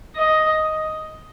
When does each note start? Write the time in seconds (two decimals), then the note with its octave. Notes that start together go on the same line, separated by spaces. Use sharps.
0.16 D#5